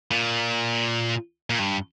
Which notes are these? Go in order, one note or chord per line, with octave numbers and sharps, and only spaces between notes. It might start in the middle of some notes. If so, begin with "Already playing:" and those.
A#2
A#2
G2